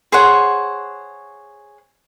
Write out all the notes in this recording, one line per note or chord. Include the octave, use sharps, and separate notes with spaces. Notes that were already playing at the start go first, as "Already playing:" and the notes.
G#4 C5 C#5 F#5